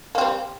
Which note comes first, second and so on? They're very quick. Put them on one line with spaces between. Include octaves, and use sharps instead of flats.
A#3 C4 G3